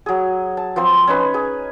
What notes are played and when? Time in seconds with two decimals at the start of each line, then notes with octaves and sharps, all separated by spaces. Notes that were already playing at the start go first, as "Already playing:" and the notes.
0.06 F#3 G#4
0.57 A5
0.76 F3 C4 C5 C6
1.07 C#4 D#4 B4 G#5
1.34 G#4